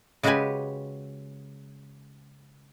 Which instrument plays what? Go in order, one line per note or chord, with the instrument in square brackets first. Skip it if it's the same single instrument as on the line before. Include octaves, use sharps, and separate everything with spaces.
[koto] C#3 G#3 F#4 G4 B4 G#5